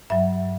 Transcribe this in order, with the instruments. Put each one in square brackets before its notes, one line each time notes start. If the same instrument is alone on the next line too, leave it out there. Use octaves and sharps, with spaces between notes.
[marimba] G2 F#3 E5